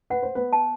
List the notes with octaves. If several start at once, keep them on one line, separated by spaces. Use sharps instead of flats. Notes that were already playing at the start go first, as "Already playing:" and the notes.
B4 F#5
C5
B3 B4
A5